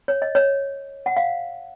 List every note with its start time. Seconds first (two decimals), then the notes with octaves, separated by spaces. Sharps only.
0.08 C#5
0.22 D#5
0.35 C#5
1.06 F#5
1.17 F5